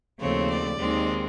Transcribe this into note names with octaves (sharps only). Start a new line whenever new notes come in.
D#2 C#3 F3 A3 C4 C#5
D5
D#2 D#3 G#3 C4